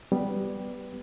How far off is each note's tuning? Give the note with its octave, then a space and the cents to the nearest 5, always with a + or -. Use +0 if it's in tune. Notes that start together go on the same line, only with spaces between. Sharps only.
G3 +0 B3 +0